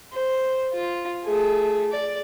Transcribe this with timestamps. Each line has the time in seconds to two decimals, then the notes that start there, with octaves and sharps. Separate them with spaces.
0.12 C5
0.74 F4
1.24 A3 G#4
1.91 D5